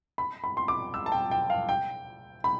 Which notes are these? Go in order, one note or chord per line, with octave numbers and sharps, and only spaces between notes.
B5
B5
C6
D6
E6
A5
G5
G5
F5
G5
B5